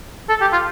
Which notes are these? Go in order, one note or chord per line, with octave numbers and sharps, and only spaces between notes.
A4
G4
F4